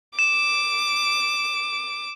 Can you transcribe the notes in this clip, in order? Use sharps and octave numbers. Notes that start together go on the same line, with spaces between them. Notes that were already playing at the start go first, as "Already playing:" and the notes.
D6 E7